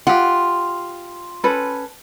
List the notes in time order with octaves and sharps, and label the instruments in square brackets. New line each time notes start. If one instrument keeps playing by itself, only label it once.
[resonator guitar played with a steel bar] F4 [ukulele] G4 F#5
[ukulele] C#4 A4 B4